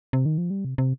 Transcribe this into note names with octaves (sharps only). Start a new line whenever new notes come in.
C3
D#3
F3
G3
C3
C3